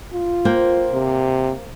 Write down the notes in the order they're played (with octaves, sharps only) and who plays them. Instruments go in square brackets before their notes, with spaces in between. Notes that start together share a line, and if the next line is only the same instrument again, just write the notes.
[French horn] F4
[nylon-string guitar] A#3 C5 G5
[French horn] C3